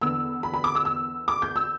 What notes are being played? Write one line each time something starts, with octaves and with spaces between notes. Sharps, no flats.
E2 D3 B3 E6
B5
B5
D6
E6
E6
D6
G6
E6